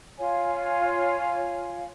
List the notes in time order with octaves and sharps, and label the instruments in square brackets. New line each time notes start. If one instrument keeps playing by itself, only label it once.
[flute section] F4 C#5 F5 G#5